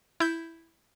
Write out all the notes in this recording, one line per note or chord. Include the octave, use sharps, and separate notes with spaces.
E4 G6